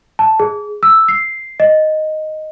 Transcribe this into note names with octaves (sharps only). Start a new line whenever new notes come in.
A5
G#4
E6
C7
D#5